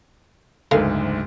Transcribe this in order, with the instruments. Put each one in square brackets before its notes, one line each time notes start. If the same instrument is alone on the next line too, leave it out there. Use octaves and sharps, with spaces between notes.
[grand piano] F#1 D2 G#2 [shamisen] A4 A#4 F5